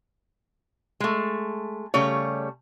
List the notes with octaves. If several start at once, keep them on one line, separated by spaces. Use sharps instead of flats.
G#3 A3
C#3 G3 A3 C#5